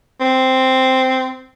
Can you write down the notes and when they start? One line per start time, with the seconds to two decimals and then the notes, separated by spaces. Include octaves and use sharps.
0.21 C4